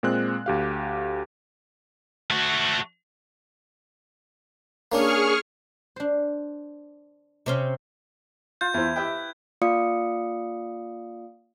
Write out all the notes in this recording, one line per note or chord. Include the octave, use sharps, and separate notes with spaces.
A#2 G#3 C4 F#6
D2 G4 F5
A3 F#4
A#3 C#4 D4 G#4 C#6 F6
D4 C5
C3 C4 C#4
F4 G6
E2 E4 C5
G4 B4 E5 G5
A#3 F4 D5 F5 D#6 C#7